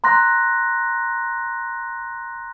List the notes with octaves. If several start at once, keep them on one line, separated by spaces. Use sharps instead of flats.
A#5 C6 F#6 A#6